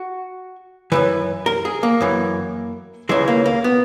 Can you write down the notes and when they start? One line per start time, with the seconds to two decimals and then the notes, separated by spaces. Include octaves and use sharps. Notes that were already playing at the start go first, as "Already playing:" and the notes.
Already playing: F#4
0.92 F#2 C#3 E3 B4
1.46 A#4
1.65 G#4
1.83 A#3
2.01 F#2 E3
3.09 C#2 C#3 E3 G#3
3.28 A#3
3.46 A#3
3.64 B3